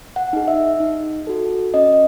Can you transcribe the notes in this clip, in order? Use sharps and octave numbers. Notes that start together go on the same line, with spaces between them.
F#5
D#4 G#4
E5
D#4
F#4 A4
C#4 D#5